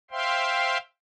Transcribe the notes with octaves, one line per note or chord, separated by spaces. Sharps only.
C5 E5 F5 G5 C6